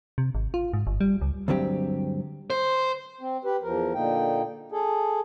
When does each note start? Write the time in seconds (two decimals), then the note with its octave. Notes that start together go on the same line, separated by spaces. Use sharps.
0.18 C3
0.35 G#1
0.54 F4
0.73 G#2
0.87 G1
1.01 G3
1.21 C#2
1.48 D2 G2 F#3 C4 G4
2.50 C5
3.21 C4
3.45 G4 B4
3.63 E2 F3 A#4
3.94 A#2 D3 A#3 D#4 G5
4.72 G#4 A4